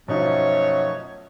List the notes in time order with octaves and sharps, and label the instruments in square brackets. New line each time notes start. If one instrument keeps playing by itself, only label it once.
[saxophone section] F#2 A3 C#5 [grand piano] B2 F3 D#4